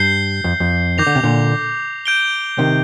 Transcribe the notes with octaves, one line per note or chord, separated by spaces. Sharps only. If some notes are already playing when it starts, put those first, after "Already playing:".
Already playing: G2 G6 C7 G7
F2
F2
D#3 D6 G6 A#6 F7
D3
C3
A#2 D3
G6 D7 G7
C3 D#3